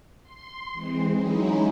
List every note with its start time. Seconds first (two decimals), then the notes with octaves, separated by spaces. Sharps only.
0.23 C6
0.72 E3 G#3 C4
1.11 F#3 G#3 C#4 D#4 E4